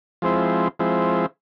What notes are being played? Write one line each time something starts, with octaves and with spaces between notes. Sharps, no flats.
F3 G#3 C4 E4
F3 G#3 C4 E4